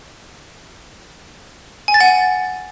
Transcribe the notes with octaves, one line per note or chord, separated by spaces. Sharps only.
G#5
A6
F#5